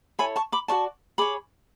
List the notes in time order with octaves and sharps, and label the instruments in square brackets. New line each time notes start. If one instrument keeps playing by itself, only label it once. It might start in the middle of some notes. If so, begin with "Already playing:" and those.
[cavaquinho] E4 A4 C#5 G#5 B5
A5 C#6
B5 D6
F#4 B4 D5 A5 C#6
G#4 C#5 B5 D6